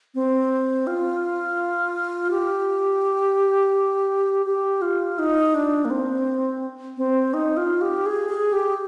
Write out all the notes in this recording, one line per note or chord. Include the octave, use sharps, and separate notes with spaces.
C4
F4
G4
G4
F4
D#4
D4
A#3
C4
C4
D#4
F4
G4
G#4
G#4
G4